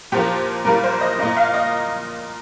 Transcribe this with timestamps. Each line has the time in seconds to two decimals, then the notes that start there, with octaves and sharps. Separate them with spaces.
0.12 A#2 F3 A#3 G4
0.65 A#2 G3 A#3 A#4
0.84 C5
1.01 D#5
1.19 A#2 A#3 D#5
1.37 F5
1.54 D#5